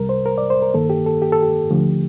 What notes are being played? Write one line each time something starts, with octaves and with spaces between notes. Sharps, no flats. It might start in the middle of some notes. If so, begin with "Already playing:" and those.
Already playing: C2 C3 G3 A#4
C5
A#4
D5
C5
A#4
G2 D#3 A#3 A4
G4
A4
G4
A4
G4
D#2 D3 F3 A3